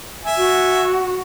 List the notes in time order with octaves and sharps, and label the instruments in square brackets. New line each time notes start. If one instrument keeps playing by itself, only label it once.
[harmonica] E5 G#5
[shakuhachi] F#4